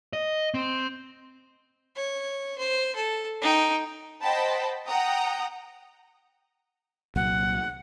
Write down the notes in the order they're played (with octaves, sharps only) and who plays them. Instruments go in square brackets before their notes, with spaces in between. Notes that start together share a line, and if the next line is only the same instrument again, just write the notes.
[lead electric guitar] D#5
C4
[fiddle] C#5
C5
A4
D#4 G5
[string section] C5 D#5 F#5 G5 A5 B5
F#5 G5 A#5 D#6
[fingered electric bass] C2 A#2 F#3 [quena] F#5